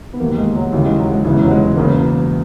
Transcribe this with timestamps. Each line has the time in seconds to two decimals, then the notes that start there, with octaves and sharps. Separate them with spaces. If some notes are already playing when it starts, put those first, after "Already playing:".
0.13 B3
0.20 E1 D#2 D#3 A#3
0.38 G#3
0.55 F#3
0.73 D#2 C#3 E3 G#3
0.86 G#3
0.99 F#3
1.12 G#3
1.24 E1 E2 C#3 E3 G#3
1.41 F#3
1.51 G#3
1.77 E1 E2 C#3 A#3